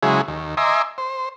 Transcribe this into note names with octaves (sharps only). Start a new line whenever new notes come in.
C#3 F#3 G#3 E4 G#4
D#2
D#5 E5 G#5 A#5 C6 D6
C5